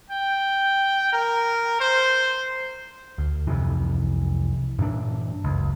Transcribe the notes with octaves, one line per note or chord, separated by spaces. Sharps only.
G5
A#4
C5
D2
C2 F2 C3 E3
G2 A#2 E3 D4
F#1 C#2